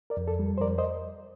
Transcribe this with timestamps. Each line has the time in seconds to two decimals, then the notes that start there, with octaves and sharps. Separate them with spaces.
0.10 A#4 D5
0.17 F2
0.28 A4
0.39 G3
0.58 C5
0.61 F2 A#4 D5
0.78 C5 D#5